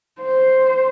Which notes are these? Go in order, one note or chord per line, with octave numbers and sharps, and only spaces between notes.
C5